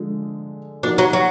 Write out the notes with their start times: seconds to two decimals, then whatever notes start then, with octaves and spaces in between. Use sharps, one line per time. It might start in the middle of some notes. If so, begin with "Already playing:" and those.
Already playing: D3 F3 G#3
0.83 A#2 F3 A#3 D4 D#4 F#4
0.98 F#3
1.13 F#3